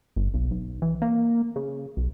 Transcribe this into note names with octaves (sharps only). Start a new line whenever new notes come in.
G1
B1
B1
E3
A#3
C#3
B1